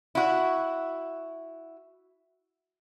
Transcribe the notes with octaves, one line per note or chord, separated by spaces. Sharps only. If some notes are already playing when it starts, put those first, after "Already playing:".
E4 F#4